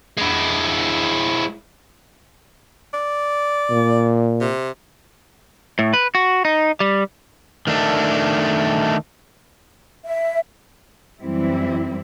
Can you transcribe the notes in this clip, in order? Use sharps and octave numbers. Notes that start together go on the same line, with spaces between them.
G#3 E4
D5
A#2
C3
A2
B4
F#4
D#4
G3
D#3 A3 D4
E5
F#2 E3 G3 C4 E4